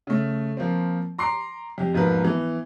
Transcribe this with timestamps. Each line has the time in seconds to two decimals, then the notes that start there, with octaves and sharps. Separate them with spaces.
0.07 C#3 A3
0.57 F3 A#3 C4
1.18 A#5 C6 D6 C7
1.78 F2 G4
1.93 E1 G#2 F3 A#3 B4
2.25 E3 B3